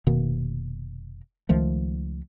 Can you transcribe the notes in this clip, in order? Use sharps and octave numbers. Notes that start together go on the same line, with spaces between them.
F1 B2 D#3 A#3
C#2 D#3 F3 A3